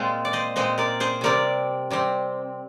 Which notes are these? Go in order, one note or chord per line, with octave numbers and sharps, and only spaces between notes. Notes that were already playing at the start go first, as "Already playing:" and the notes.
Already playing: A#2 G#3 C4 F4 G#4 C5
D5
C5 D#5
A#2 G#3 C4 C5 D#5
A#4 D5
G#4 C5
C3 G3 C4 A#4 D5
C3 G3 C4